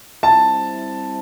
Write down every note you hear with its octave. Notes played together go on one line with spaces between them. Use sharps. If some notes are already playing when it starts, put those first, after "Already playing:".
G3 C4 E4 A5